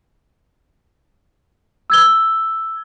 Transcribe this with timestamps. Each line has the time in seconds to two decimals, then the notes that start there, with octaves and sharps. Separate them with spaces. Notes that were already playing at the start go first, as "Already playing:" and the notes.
1.90 E6 G#6 G7